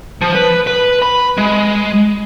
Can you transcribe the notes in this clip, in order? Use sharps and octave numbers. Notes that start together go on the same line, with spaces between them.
F3
B4
B4
B5
G#3